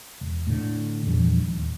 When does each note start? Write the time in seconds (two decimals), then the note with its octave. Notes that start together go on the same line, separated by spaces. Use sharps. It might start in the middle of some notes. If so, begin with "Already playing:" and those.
0.21 E1
0.47 A2 D3
1.07 E2 G2 A#2 F3
1.42 D1 D#2